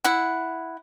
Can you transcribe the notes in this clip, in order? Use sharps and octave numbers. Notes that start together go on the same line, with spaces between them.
E4 F#5